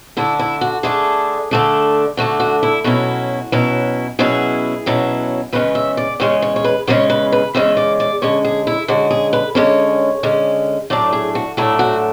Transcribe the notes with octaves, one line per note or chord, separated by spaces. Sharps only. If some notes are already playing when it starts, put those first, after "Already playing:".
D3 A3 D4 E4
E4
F#4
D3 A3 D4 G#4
D3 A3 D4
D3 A3 D4 F#4
F#4
E4
B2 F#3 C#4 E4 F#4
B2 F#3 C#4 E4
B2 F#3 C#4 E4 G#4
B2 F#3 C#4 E4
E2 C#3 G#3 C#4 B4
E5
D5
E2 C#3 G#3 C#4 C#5
C#5
C#5
B4
E2 C#3 G#3 C#4 C#5
B4
B4
E2 C#3 G#3 C#4 E5
D5
D5
D3 G#3 C#4 C#5
G#4
E4
D3 G#3 C#4 F#4
G#4
B4
D3 G#3 C#4 C#5
D3 G#3 C#4
A2 F#3 A3 D4 D5
G#4
F#4
A2 F#3 A3 D4 E4
F#4